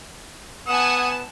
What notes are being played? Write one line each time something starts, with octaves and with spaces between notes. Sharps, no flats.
B3 F#5 G#5 A5 D#6 E7